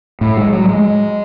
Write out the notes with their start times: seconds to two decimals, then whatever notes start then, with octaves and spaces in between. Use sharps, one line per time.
0.21 A2
0.37 G#3
0.52 F#3
0.68 G#3